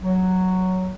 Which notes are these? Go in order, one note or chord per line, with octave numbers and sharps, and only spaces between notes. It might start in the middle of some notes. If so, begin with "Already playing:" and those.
F#3